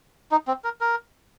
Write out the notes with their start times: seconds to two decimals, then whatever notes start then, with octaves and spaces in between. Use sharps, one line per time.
0.31 D#4
0.48 C4
0.64 A#4
0.81 A#4